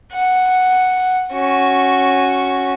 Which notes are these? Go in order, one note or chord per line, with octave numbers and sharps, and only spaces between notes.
F#5
C#4 F#4